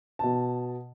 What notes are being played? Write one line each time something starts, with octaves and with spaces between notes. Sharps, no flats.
B2 A5